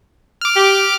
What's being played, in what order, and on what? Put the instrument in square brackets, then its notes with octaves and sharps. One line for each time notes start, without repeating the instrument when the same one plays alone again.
[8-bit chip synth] D6 F6
[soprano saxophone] G4